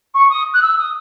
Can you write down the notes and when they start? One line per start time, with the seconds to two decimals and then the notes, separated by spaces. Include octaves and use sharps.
0.14 C#6
0.29 D#6
0.53 F#6
0.62 E6
0.78 D#6